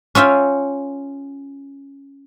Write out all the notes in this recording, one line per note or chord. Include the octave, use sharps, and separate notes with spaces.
C#4 F4 E5 G5